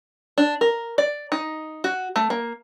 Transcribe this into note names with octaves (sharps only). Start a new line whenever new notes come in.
D4
A#4
D5
D#4
F#4
A3
A#3